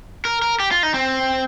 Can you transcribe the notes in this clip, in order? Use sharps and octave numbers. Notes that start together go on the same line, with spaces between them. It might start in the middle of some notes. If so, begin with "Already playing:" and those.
A#4
A#4
G4
F4
D#4
C4